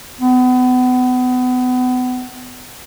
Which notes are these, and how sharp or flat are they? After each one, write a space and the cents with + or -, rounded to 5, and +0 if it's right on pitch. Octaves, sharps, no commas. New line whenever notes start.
B3 +30